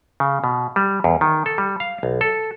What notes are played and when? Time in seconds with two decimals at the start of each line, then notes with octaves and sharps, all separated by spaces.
0.20 C#3
0.44 B2
0.76 G3
1.04 E2
1.21 D#3
1.46 A4
1.58 G3
1.80 F5
2.03 B1
2.21 A4